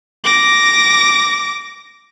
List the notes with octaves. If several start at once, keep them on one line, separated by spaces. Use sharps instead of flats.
D6 A#6